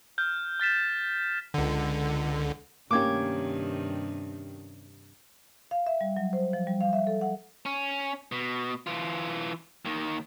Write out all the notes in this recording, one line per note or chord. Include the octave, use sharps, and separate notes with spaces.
F6 G6
F6 A6 B6 E7
C#2 D3
G2 C3 D#3 A#3 C#4 G4 D6 G#6
F5
E5
G3
F#3
C5
F3
G3
F5
E5
A4
F#5
C#4
B2
E3 F4
D#2 D#3